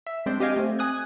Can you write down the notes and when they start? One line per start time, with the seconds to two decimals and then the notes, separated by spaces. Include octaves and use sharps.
0.07 E5
0.26 G#3 C4 D4 C5
0.40 G4 D#5 F5 G#5
0.56 A3 C4
0.79 G#5 D#6 F#6 G#6